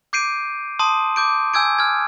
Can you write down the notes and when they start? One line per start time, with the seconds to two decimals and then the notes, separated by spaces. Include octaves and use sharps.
0.13 D6 G6 C7 D7 D#7
0.79 A5 C6 D#6 D#7
1.16 D6 G6 D7
1.54 G#5 E6 G6 G#6 D7
1.78 F6 G#6